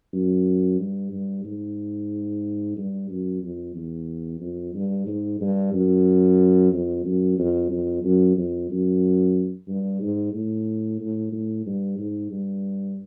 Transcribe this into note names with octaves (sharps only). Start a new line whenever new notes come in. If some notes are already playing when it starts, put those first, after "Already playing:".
F#2
G2
G2
G#2
G2
F#2
F2
E2
F2
G2
G#2
G2
F#2
F2
F#2
F2
F2
F#2
F2
F#2
G2
G#2
A2
A2
A2
G2
G#2
G2